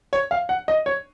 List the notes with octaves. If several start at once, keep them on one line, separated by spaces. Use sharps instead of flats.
C#5
F5
F#5
D#5
C#5